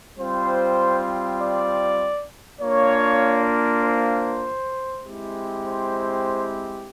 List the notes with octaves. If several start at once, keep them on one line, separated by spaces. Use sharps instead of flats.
G3 C4 F4 C5
D5
A#3 D4 F4 C#5
C5
G#3 C4 E4 G4
C5